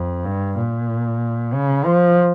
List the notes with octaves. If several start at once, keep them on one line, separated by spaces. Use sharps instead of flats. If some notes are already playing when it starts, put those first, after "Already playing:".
Already playing: F2
G2
A#2
C#3
F3